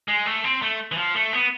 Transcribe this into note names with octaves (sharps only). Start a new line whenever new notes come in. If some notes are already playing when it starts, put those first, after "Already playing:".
G#3
A3
C4
A3
E3
F3
A3
B3